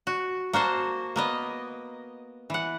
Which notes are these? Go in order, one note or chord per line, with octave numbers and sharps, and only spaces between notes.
F#4
A#3 F#4 C5 A5
A#3 B3 D#5
E3 F#5